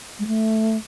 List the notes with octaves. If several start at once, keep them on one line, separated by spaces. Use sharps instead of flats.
G#3
A3